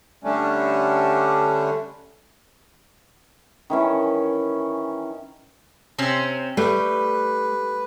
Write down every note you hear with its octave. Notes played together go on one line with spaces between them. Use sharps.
D3 G3 A3 C#4 D4
D#3 E3 C#4
C3 C4 C#4
G3 A3 B4